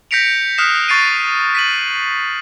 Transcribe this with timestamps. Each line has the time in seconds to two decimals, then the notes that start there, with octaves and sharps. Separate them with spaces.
0.11 G6 A#6 B6 C#7 D7 F7
0.58 D#6 F6 F#6 B6 C7 E7
0.88 C#6 A6 C7 D7 D#7
1.55 B6 D#7 F#7